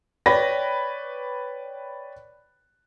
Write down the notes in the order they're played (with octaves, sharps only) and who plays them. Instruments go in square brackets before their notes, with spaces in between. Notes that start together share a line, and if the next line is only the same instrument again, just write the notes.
[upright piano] B4 C#5 D5 G5 A#6